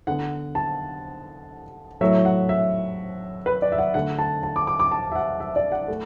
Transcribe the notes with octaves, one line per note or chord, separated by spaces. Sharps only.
D3 B3 F#5
A5
A2 F#3 A3 E5
F#5
E5
B4
D5
E5
F#5
D3 A3 F#5
A5
A5
D6
D6
D6
A5
E5
F#5
E5
D5
F#5
A3